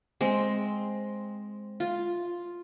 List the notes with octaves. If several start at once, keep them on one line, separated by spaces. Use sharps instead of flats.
G#3 C4
F4